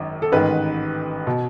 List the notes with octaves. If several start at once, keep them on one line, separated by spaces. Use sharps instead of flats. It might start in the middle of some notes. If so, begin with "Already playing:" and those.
Already playing: G#1 F#2 D#3
A4
A1 G#2 D#3 B4
B2